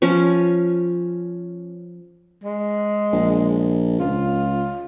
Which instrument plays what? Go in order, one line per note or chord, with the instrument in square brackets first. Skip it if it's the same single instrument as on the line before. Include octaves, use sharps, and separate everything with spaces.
[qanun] F3 C#4
[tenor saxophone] G#3
[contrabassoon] A#1
[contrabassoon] C#2 [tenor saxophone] F4